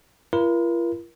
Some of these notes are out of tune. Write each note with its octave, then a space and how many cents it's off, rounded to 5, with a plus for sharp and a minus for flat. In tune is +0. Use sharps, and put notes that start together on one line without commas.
F4 -45 A#4 +35